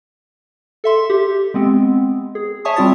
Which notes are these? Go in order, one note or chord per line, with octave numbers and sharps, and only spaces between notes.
A4 E5 C6
G4
G#3 B3 C4
G#4
C#5 E5 G#5 A5 C#6 D#6
G3 C4 F4 D#6 A6